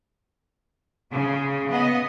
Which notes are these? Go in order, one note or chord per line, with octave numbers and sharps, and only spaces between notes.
C#3
B3 D#5